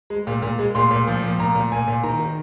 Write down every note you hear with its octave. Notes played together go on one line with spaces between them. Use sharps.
G#3
A#2
A#2
G#3
A#2 C6
A#2
F3
A#2
A#2 A#5
A#2
A#2 G#5
A#2
D#3 A#5
D#3